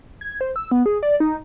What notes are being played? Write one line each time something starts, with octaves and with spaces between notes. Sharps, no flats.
G#6
C5
E6
B3
G#4
D5
D#4